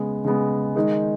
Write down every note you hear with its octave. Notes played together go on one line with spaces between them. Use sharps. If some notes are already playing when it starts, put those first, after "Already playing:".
Already playing: C#3 G#3 B3
C#3 G#3 B3
D#3 G#3 D#4